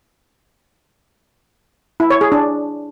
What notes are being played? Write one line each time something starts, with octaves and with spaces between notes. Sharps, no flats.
E4
C#5
G#4
D4